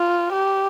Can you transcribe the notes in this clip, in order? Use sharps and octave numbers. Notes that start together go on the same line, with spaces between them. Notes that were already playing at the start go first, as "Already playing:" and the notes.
Already playing: F4
G4